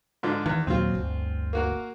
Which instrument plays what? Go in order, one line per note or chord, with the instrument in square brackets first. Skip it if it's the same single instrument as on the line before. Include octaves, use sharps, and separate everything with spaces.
[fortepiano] G#2 D3 F3
[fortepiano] E2 [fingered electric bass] D#3
[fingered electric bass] D#2 A#2 F#3 [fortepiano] C4 F4
[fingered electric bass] G1 D2
[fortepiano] A#3 F#4 A#4